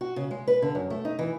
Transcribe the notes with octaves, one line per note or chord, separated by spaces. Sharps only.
F#4
C#3
G#3
B4
D3
F#2
A3
D#4
E3